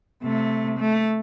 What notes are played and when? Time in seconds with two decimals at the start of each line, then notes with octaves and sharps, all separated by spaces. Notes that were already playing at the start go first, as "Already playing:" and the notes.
0.23 C3 A3
0.79 A3